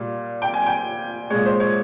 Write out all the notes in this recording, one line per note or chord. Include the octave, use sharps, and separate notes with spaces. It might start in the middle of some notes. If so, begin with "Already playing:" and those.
Already playing: A#2 G3
G5
G#5
G5
A#2 G#3 C#5
C5
C#5